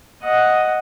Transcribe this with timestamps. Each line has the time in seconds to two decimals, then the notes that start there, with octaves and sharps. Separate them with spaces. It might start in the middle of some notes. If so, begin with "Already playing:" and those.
0.22 D#5 F#5